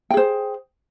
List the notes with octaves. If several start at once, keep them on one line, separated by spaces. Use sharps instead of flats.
G#4 C5 G5